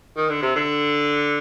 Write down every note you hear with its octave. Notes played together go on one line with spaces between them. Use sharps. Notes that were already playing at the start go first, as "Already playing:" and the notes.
D#3
D3
C3
D3